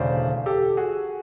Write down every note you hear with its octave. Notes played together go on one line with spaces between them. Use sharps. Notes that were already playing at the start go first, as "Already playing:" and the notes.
Already playing: E1 D2 C#3 C5 D5
G4 A4
F#4 G#4